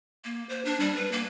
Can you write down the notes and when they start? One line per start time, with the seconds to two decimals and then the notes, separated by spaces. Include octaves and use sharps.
0.25 A#3
0.49 C5
0.65 D4
0.80 G3
0.96 B4
1.12 A#3